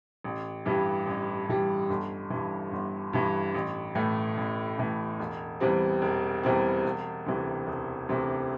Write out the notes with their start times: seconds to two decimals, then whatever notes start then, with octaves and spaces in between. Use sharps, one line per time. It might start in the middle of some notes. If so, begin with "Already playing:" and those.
0.24 A1
0.65 G2 E3 G3
1.07 A1
1.48 G2 E3 G3
1.90 G1
2.30 G2 E3
2.71 G1
3.13 G2 E3
3.55 A1
3.95 A2 E3 A3
4.37 A1
4.78 A2 E3 A3
5.19 E1
5.60 E2 E3 G3 C4
6.02 E1
6.43 E2 E3 G3 C4
6.84 E1
7.26 D2 C3 E3
7.67 E1
8.09 D2 C3 E3